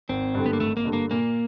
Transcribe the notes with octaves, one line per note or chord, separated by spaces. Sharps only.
G#1 C4
G2 D3
B3
A#3
G#1 A3
A#3
G2 D3
A#3
A#2 A#3